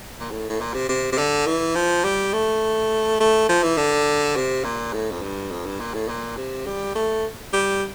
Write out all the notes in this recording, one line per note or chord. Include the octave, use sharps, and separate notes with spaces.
A#2
A2
A2
A#2
C3
C3
C3
D3
E3
F3
G3
A3
A3
F3
E3
D3
C3
A#2
A2
F2
G2
F2
G2
A#2
A2
A#2
C3
G3
A3
G3